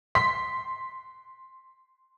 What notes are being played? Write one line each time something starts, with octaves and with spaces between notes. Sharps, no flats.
C6 B6